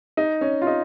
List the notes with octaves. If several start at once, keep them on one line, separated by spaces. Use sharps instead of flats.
D#4
C#4
F4
D#4